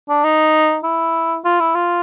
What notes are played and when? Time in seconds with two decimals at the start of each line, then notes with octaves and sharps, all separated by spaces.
0.09 D4
0.24 D#4
0.84 E4
1.45 F4
1.60 E4
1.75 F4